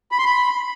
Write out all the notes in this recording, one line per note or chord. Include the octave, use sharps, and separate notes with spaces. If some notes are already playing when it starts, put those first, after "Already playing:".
B5
C6
B5